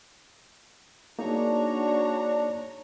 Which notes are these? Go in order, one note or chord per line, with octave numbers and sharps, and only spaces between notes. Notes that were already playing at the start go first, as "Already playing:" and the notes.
A#3 D4 D#4 F#4 G#4 C#5 A#5